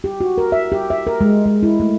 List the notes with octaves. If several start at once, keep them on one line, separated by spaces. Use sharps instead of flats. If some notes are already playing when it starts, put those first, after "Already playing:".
G4
F#4
A#4
E5
G4
E5
A#4
G#3
G#3
E4
A3